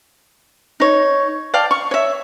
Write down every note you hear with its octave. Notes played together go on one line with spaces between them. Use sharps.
D#4 C#5
D5 F5 G5 A5
C#6
C#5 E5